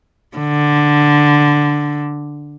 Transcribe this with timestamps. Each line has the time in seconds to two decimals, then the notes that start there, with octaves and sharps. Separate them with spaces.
0.37 D3